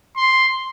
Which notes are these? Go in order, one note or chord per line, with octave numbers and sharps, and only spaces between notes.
C6